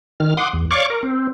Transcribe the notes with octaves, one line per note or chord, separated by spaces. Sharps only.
D#3 F6
F#5 C6 D6 D#6
E2
C#5 D5 F5 C#6 D6
A#4
C4